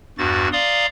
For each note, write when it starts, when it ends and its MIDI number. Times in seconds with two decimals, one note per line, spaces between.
0.18 0.48 40
0.18 0.48 43
0.18 0.48 66
0.18 0.48 93
0.52 0.86 74
0.52 0.86 77
0.52 0.86 82
0.52 0.86 84
0.52 0.86 87